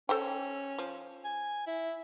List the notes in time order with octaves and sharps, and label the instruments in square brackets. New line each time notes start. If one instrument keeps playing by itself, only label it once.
[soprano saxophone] C#4 [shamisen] A4 C5 G5
[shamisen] F3
[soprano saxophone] G#5
E4